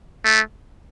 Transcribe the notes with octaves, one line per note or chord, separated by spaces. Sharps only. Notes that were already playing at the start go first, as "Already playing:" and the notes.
A3